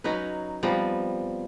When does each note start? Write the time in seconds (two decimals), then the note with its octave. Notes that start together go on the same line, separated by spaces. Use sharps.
0.04 F#3 C#4 D#4 B4
0.63 F3 G3 B3 C4